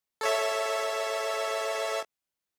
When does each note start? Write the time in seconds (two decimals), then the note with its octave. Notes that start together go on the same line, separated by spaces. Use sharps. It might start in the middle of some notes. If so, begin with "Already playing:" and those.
0.21 A4 C#5 E5